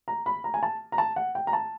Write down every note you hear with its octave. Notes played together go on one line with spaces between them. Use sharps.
A#5
B5
A#5
G#5
A5
A#5
A5
F#5
G5
A#5
A5